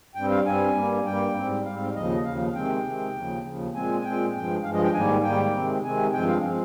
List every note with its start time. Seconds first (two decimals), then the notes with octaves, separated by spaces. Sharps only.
0.15 G2 G3 C4 G5
0.31 F5
0.46 G2 G3 C4 G#5
0.75 G2 G3 A#3
1.05 G2 G3 A#3 G5
1.35 G#2 G3 C4
1.65 G#2 G3 C4 F5
1.95 D#2 C#3 F3 D#5
2.24 D#2 C#3 F3 F5
2.55 C3 D#3 G#3 C4 G5
2.84 C3 D#3 G#3 C4
3.15 D#2 C#3 F3
3.44 D#2 C#3 F3
3.74 A#2 G#3 C4 G#5
4.00 G#5
4.04 A#2 G#3 C4 G5
4.34 G2 F3 G#3 G5
4.64 G2 F3 G#3 F5
4.74 D#5
4.84 G5
4.94 G#2 D#3 G3 A#3 G#5
5.23 G#2 D#3 G3 A#3 G5
5.53 C3 D#3 G#3 C4
5.83 C3 D#3 G#3 C4 G#5
6.13 G2 F3 G#3 C4 G5
6.28 F5
6.43 F3 G#3 C4